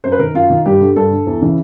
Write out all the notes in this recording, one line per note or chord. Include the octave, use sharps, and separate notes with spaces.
F#2 C5
B4
D#3 A#4
F#2 F4
D#3
G2 G4
D3
G2 A4
D3
E2
C#3 E3